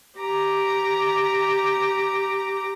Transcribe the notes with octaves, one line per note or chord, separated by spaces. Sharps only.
G4 A#5 D6